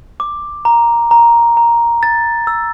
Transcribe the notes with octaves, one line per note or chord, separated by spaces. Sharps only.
D6
A#5
A#5
A#5
A6
E6